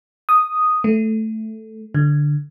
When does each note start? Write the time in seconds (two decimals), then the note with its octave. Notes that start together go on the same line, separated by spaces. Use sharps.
0.29 D#6
0.84 A3
1.95 D3